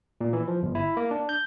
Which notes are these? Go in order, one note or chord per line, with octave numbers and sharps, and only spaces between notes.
A#2
E3
F3
G1
E4
A#3
D4
G6